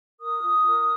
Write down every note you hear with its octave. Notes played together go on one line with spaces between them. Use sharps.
A#4 D#6
F4
A#4